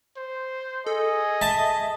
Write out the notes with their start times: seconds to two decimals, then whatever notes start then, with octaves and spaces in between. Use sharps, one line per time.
0.17 C5
0.87 G#4 A4 D#5
1.42 E5 A5